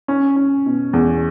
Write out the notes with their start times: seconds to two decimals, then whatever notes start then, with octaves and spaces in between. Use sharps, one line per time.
0.08 C#4
0.36 C#4
0.66 B2
0.93 E2